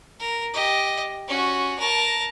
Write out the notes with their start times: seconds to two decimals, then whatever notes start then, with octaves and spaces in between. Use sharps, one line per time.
0.20 A#4
0.54 G4 D#5
1.28 C#4 F#4
1.79 A#4 A5